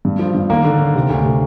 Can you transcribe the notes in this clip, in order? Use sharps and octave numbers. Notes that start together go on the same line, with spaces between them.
G2
F3
G2
D#2 A#3
D3
D#2
C3
D2
C3